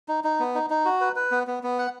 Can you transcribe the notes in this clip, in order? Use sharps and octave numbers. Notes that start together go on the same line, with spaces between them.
D#4
D#4
B3
D#4
D#4
F#4
B4
B4
B3
B3
B3
F#5